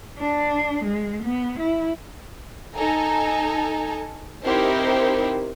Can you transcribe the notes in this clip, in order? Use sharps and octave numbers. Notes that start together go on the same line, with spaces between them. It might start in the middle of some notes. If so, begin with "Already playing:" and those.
D4
G#3
B3
E4
D#4 A4 G#5 A#5
C4 D#4 E4 G4 A#4 C5